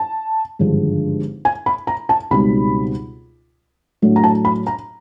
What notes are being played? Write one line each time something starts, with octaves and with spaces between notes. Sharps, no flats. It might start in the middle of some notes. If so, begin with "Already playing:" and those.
Already playing: A5
G#1 G2 D3 F3 G#3
G#5
B5
A#5
A5
C#2 B2 G3 C4 D#4 B5
A2 F#3 A3 D4
A#5
A5
B5
A#5